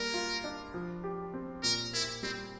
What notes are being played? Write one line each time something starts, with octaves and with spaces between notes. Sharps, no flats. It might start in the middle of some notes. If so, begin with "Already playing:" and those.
Already playing: G3 A#3 A#4
F4
D4
F3
G4
C4
A#2 A#4
A#3 E4
G3 C4